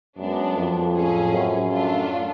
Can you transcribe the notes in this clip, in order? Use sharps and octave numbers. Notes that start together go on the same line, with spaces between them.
F#2 G#3 B3 D4
F2
A2 F#3 C#4 G#4
F#2
A3 D4 F4